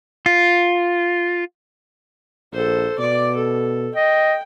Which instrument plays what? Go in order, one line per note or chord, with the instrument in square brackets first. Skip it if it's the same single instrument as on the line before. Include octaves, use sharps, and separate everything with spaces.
[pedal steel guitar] F4
[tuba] A#1 [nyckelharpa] A4 C5
[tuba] B2 [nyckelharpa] D5 D6
[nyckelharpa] A4
[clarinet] D#5 [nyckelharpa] G5